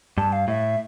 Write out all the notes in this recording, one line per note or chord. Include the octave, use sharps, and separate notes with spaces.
G2 A5
F5
A2 E5